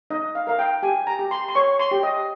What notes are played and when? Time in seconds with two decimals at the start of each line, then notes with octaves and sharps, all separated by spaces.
0.10 D#4 D#5
0.35 F5
0.47 A#4 F5
0.59 G5
0.83 G4 G#5
1.07 A#5
1.19 G4
1.31 C6
1.48 C6
1.55 C#5 C#6
1.79 C6
1.91 G4
2.03 D#5